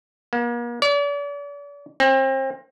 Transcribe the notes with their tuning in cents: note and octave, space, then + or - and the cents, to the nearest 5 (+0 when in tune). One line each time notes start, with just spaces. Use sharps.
A#3 +40
D5 -40
C4 +35